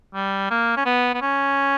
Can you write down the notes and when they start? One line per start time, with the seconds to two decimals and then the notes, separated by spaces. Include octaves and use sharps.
0.14 G3
0.51 A#3
0.77 C#4
0.86 B3
1.14 B3
1.22 C#4